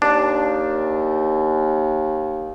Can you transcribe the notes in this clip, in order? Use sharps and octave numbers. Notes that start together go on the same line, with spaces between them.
D#2 D4